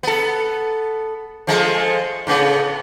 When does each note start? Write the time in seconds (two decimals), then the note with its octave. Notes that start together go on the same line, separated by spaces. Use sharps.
0.03 B3 A4
1.47 F3 G#3 A3
2.27 A2 C#3 B3